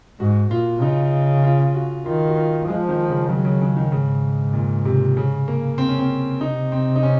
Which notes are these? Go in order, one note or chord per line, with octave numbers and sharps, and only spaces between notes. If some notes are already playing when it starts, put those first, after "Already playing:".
G#2 F#4
A#2 F4
C#3 D#4
F4
F#4
D#3 F4
F#4
F4
F3 G#3
D#3
C#3
C#3 F#3
C#3
C#3
D#3
G#2 C#3
A#2
C3
C#3
A#3
C4
C#4
C4
C3 D#4
C4
D#4
C#4